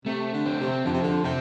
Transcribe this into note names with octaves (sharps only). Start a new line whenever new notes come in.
C3 A3
D3
C4
C3
D3 F3
C3
D3
C3 C4